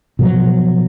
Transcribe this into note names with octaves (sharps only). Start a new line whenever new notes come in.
B2 F3 F#3